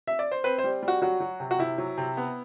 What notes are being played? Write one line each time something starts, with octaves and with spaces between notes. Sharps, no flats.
E5
D5
C5
C4 B4
C5
G3
G3
F#4
F#3 F#4
F#3
C3
F#4
C3 E4
F#3
C3
B3